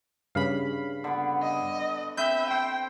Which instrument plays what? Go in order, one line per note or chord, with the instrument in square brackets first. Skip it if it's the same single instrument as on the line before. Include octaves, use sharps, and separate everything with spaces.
[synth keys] G2 C#3 B5 [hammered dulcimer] F5
[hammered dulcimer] D3 B3
[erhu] D#5
[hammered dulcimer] C4 B4 [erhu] E5 [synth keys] G6
[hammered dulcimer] C5 [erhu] G5